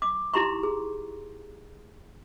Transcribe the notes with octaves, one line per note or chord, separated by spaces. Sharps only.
D6
D#4 E4 G4 A#5 C6 C#6
G#4